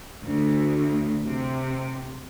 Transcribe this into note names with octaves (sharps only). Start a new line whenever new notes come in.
D2
C3